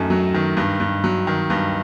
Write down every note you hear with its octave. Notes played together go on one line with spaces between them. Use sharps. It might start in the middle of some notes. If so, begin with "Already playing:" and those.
Already playing: F#2 D#3 A3
F#3
D#3
G2
G2
F#3
D#3
G2